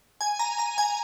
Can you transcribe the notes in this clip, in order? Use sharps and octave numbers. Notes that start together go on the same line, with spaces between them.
G#5
A#5
A#5
G#5